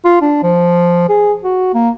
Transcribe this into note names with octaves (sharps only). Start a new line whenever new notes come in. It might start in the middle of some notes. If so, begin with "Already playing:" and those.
F4
D4
F3
G#4
F#4
A#3